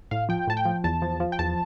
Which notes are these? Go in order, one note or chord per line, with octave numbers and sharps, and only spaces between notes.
A2 F5
F3 G5
A2 A5
G5
F3
E2 A5
F3
F3
G5
E2 A5